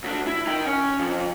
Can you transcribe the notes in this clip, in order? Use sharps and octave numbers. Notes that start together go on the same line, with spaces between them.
D2 D4
E4
D#4 G5
C#4
F2